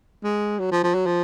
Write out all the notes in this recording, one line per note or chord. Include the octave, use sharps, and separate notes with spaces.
G#3
F#3
F3
F3
F#3
F3